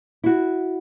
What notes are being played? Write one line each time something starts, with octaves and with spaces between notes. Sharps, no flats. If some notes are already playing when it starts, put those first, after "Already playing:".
E4 F#4